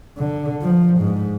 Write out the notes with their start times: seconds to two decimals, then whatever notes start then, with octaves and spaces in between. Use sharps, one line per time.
0.18 D3
0.62 F3
0.99 G#2